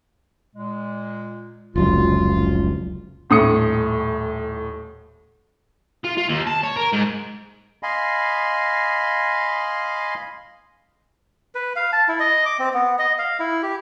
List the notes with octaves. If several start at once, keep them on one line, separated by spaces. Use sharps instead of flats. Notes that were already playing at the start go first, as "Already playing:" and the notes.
A#2 G#3
F1 C#2 F#3 F4
D#1 A2 D#6 C#7
F4
F4
D#2
A5
C#5
A#4
G#2
D#5 F5 G#5 B5 C6
B4
F5
A5
E4
D#5
D6
C4
B3
D#5
F5
E4
G4